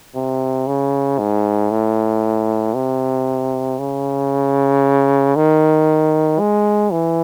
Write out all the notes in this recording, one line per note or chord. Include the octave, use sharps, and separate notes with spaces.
C3
C#3
G#2
A2
C3
C#3
D#3
G#3
E3